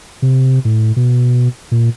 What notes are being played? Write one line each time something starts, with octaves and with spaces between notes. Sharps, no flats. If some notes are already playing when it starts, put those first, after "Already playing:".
C3
A2
B2
A#2